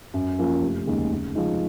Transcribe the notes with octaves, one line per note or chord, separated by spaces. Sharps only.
F#2
F3 A#3 C#4 F4
F1
D#2 C#3 G#3 D#4
C#3
F3 G#3 D#4